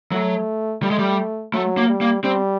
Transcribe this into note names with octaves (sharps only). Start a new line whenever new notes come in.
F#3 A3
G3 A3
G#3
G3
F#3 A3
A#3
G3
A#3
G3 C4